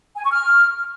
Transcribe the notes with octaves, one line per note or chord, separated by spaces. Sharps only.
G#5
C#6
F6